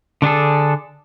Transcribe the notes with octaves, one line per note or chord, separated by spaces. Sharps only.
D3 D4 G#4 A4